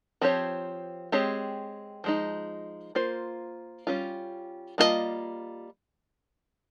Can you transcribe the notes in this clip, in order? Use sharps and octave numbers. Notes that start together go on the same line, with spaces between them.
F3 C4 G4 C#5
G#3 C4 G4 C#5
F3 G#3 D#4
A#3 F4 C5
G3 C#4 F4
G3 A#3 F4 G#4 D#5